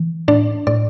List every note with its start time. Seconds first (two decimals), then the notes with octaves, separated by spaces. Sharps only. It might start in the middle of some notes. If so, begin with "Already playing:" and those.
Already playing: E3
0.28 A2 D4 D5
0.67 A2 D5